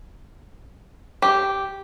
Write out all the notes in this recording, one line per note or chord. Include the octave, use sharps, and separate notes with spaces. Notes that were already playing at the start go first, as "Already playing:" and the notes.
G4